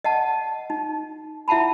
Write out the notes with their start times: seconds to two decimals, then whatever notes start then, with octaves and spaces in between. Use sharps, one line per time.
0.04 D#5 F#5 A5
0.70 D#4
1.48 E4 E5 F#5 A5 B5